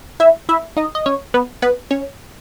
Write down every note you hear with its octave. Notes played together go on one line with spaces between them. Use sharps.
E4 E5
E4 E5
D#4 D#5
D#5
C#4 C#5
B3 B4
B3 B4
C#4 C#5